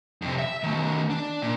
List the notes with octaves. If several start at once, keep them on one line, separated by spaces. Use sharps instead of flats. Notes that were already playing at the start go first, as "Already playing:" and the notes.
F2 C3
E5
D#3 A3
D4
A#2